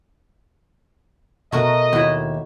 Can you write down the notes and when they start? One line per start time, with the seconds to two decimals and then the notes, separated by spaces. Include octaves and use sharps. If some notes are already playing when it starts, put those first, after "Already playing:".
1.52 B2 A3 F#4 A#4 D#5
1.93 D#2 E4 F#4